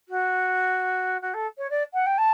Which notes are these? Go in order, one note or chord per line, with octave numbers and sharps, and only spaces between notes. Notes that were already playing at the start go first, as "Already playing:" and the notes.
F#4
F#4
A4
C#5
D5
F#5
G5
A5